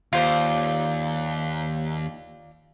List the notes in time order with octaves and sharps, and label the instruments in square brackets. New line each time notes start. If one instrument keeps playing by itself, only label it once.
[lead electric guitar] D#2 [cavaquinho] F4 C5 D5